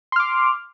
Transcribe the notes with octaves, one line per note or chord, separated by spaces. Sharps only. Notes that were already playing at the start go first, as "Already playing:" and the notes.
C6 D6 F6